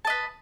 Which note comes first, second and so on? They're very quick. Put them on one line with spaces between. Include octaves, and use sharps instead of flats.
A5 D#5 B4